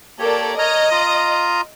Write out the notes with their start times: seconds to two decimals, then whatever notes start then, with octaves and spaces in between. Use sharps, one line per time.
0.19 A#3 G4 A4 A#4 C#5 D5
0.58 C#5 D#5 A#5 F6
0.91 F4 A#5 D#6